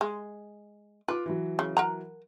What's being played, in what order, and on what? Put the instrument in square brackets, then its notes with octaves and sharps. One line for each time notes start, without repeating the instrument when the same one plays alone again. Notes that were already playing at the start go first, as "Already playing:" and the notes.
[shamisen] G#3
[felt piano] F4 D6 [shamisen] B4
[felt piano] E3 F#3
[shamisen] C#3
A#4 F#5 A#5